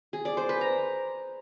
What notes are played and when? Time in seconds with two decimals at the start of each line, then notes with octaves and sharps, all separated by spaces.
0.13 G#4
0.25 D5
0.37 C5
0.49 B4
0.61 A#5